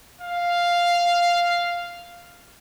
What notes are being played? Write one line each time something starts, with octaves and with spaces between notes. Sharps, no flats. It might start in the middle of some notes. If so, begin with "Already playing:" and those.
F5